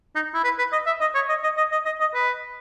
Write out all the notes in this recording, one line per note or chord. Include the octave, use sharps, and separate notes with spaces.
D#4
E4
B4
B4
D#5
E5
D#5
C#5
D#5
D#5
D#5
D#5
D#5
D#5
B4